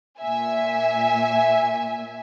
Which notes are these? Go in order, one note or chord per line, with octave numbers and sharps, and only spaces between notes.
A#2 E5 G#5